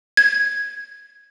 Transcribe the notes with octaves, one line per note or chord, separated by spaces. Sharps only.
G#6